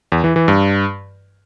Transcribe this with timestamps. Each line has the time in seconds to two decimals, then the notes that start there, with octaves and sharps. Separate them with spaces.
0.12 E2
0.24 E3
0.36 E3
0.48 G2